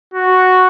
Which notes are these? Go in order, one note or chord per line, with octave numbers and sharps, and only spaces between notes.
F#4